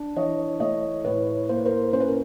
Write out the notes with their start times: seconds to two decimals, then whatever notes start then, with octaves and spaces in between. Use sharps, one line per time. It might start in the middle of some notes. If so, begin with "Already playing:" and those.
Already playing: D4
0.16 E3 C#5 D#5
0.60 A3 C#5 D#5
1.05 A2 B4 C#5
1.49 A#3 C5
1.57 B4
1.65 A#4 C5
1.93 C#4 C5
2.00 B4
2.08 A#4